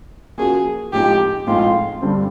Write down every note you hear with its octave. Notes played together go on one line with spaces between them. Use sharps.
F3 A#3 C#4 F#4 G#4 A#4
A2 F3 G#3 C4 D#4 G4
A2 F3 G#3 C4 D#4 F4
G2 D3 G3 C4